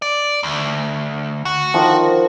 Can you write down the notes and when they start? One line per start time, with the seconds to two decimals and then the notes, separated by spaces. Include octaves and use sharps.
0.02 D5
0.43 D2
1.45 F#4
1.74 D#3 F3